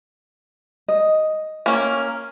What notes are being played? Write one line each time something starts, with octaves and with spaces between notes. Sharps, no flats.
D#5
A#3 C#4